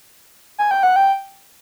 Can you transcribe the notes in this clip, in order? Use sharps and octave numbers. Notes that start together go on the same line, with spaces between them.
G#5
G5
F#5
G5